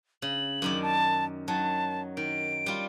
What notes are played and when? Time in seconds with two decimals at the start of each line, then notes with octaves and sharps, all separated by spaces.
0.22 C#3 F#7
0.62 F#2 D#3 D5
0.82 A5
1.48 D#3 F#3 A5
2.17 D#3 D7
2.66 G3 F4